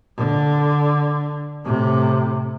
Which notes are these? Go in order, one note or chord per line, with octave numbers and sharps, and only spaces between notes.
D3
A2 C3